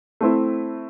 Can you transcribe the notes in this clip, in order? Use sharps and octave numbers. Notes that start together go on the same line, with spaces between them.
A3 C4 E4